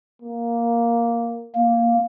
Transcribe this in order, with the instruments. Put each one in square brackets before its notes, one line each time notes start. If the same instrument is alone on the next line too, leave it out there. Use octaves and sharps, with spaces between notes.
[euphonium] A#3
[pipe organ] A#3